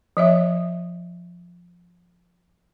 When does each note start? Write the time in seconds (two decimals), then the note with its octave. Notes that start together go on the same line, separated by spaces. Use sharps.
0.17 F3 C#5 E5